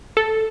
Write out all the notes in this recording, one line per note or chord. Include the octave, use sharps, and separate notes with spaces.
A4